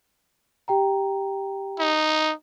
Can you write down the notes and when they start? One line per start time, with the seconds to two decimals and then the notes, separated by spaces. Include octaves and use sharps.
0.68 G4 G5 A#5
1.79 D#4